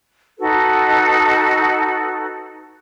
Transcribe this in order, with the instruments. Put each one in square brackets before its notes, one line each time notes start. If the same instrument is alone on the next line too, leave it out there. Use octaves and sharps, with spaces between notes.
[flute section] D#4 F#4 A4 B4